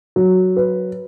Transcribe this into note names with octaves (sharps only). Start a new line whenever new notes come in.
F#3
B4